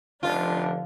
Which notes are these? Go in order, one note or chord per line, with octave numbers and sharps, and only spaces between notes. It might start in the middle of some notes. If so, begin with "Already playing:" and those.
F1 D3 F3 D4 F4